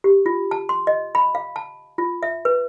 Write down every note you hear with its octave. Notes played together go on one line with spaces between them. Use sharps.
G4
F4
A5
C6
D#5
B5
F5
A5
F4
E5
B4